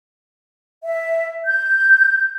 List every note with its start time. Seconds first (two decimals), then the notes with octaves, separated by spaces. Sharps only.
0.84 E5
1.46 G6